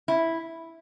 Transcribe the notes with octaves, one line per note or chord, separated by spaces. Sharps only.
E4